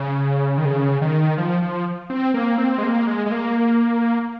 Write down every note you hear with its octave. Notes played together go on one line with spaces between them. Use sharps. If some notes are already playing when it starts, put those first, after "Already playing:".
Already playing: C#3
D#3
C#3
D#3
F3
F3
C4
A#3
C4
G#3
A#3
G#3
G#3
A#3